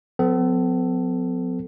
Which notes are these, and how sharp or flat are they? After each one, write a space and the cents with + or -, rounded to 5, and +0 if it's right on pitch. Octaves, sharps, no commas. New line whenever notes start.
F#3 -40 B3 +45 A4 +0